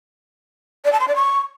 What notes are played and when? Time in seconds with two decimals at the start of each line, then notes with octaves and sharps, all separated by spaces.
0.85 D5
0.92 A5
1.00 C6
1.08 D5
1.16 C#6